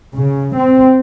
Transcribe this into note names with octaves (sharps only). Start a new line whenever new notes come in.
C#3
C4